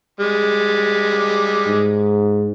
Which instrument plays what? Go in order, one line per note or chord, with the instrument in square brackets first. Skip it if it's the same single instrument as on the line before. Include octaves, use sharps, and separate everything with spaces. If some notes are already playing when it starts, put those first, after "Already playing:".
[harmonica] G3 G#3
[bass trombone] G#2